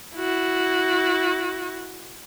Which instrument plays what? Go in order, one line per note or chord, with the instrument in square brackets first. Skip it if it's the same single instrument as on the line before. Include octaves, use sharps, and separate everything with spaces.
[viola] E4 F#4